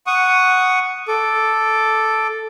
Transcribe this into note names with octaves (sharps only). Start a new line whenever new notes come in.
F#5 C#6 D#6
A4 D6